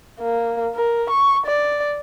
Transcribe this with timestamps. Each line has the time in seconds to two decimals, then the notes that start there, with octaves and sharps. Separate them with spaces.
0.20 A#3
0.75 A#4
1.10 C#6
1.46 D5